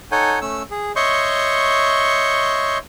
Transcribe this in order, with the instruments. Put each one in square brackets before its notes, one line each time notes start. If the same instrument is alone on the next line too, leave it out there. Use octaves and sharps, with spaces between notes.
[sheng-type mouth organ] D#4 A4 C#5 F#5 G#5 G6
A3 C#4 E6
G#4
C#5 D#5 E5 C6 C#6 G6